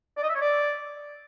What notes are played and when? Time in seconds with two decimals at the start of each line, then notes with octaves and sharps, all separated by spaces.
0.17 D5
0.23 D#5
0.29 E5
0.35 C#5
0.41 D5